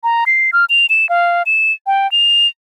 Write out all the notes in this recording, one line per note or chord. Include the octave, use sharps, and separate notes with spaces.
A#5
C7
F6
F7
E7
F5
E7
G5
F7